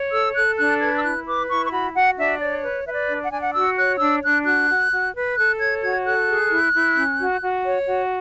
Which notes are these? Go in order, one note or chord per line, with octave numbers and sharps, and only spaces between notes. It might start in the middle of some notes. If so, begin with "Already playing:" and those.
Already playing: C#5
A4 E6
A4 F#6
D4 F#6
B4 G#6
E6
E4 F#6
B4 D6
E4 C#6
C#6
F#4 B5
F#4 F#5
D4 E5
C#5 D5
B4
B4 E5
D5
D4
F#5
D4 G#5
F#5
F#4 E6
C#5 F#6
D4 E6
D4 F#6
F#4 F#6
F#4
F#4
B4
A4 F#6
C#5 G#6
F#4 G#6
A4 F#6
G#4
E4
E4
C#4
F#4
F#4
C#5
F#4